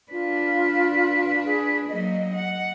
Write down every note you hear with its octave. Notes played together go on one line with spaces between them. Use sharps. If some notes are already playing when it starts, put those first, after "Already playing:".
D4 F4 B4
G#4
F#3 A#3 D#5
F#5